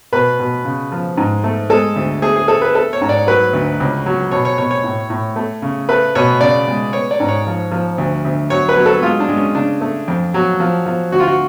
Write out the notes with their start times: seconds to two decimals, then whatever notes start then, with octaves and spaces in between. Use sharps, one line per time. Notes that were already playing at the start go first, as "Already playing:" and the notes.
0.13 B2 B4
0.40 B2
0.65 C#3
0.92 F3
1.18 G#2
1.44 A3
1.70 G#3 A4
1.96 D2
2.22 A3 G#4
2.36 G#4
2.48 A3 A4
2.62 B4
2.75 A3 A4
2.93 C#5
3.02 G#2
3.09 D5
3.27 F#3 B4
3.53 D2
3.80 C#2
4.06 F#3
4.31 B2 C#5
4.45 C#5
4.58 B2 C#5
4.71 C#5
4.84 A2
5.10 A2
5.36 A3
5.62 C#3
5.89 A3 B4
6.15 B2 C#5
6.41 C#3 D5
6.68 G#3
6.93 B3 C#5
7.11 D5
7.20 G#2
7.28 C#5
7.46 F3
7.72 F3
7.98 D2
8.24 D2
8.50 F#3 C#5
8.69 B4
8.77 F#3
8.86 A4
9.02 G#3 F4
9.20 D4
9.29 G#3
9.37 C#4
9.55 C#3 D4
9.81 A3
10.08 F2
10.34 F#3
10.60 F3
10.86 F3
11.12 D2 F#4
11.20 F4
11.28 F#4